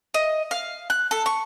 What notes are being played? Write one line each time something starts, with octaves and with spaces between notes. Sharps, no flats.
D#5
F5
F#6
A4
C#6